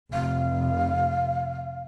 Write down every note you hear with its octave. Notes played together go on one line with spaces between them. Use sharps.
F1 F5